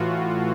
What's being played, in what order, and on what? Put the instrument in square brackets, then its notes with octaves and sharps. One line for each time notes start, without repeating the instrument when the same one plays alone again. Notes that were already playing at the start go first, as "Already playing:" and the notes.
Already playing: [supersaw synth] A2 E3 F4 F#4